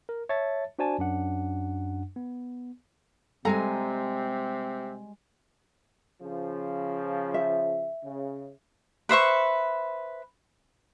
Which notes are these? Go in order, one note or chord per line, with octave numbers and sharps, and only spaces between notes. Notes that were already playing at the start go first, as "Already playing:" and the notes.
A#4
C#5 E5 A5 A6
D4 F#4 C5 D5 G#5 A5
F#2 D4 F#5
B3
C3 G3 G#3 C4 A4 G#5 A#5
C#3 F3
E5
C#3
B4 C5 E5 C#6